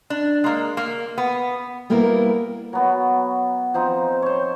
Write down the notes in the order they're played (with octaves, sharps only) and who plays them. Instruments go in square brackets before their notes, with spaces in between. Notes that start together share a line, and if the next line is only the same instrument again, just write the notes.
[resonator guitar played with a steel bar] D4
G#3 A#3
A#3
B3
[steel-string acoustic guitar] G3 A#3 B3 E4 A#4
[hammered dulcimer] F#3 B3 F#4
F3 C4 D#4
C5 C#5